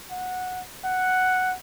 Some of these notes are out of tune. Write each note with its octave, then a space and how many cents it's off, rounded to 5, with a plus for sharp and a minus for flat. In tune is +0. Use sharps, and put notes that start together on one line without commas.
F#5 -15
F#5 +0